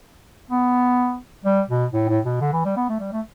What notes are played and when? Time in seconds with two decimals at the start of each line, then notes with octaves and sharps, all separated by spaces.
0.50 B3
1.45 G3
1.69 B2
1.93 A2
2.09 A2
2.25 B2
2.41 D3
2.52 E3
2.65 G3
2.76 B3
2.89 A3
3.00 G3
3.12 A3